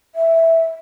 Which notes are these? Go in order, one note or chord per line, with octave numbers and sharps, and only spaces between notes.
E5